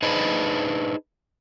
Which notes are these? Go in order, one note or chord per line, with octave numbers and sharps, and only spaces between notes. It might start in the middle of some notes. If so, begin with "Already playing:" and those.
D4 D#4 G#4 B4 C5 D#5